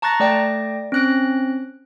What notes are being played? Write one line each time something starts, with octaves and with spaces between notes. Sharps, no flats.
A5 A#5 C#6 F#6 A6 A#6
A3 D5 G5 A#6
C4 C#4 F#6 A#6 D7